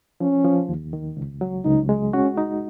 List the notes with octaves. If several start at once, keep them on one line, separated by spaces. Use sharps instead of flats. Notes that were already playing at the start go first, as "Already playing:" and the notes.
F3 C#4
F3
D#2
D#3
C#2
F#3
C#2 D#4
G#3
C#4 F#4
D#4